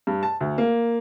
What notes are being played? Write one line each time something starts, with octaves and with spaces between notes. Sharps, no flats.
G2
A5
D2
A#3